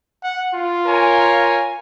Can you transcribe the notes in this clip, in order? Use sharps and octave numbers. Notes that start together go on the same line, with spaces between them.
F#5
F4
A#4 C#5 G#5